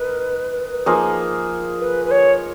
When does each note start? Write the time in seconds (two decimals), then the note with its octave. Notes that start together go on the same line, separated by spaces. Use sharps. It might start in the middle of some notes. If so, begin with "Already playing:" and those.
Already playing: D#4 A#4 B4
0.86 F3 A#3 D#4 G#4
1.80 B4
2.06 B4
2.11 C#5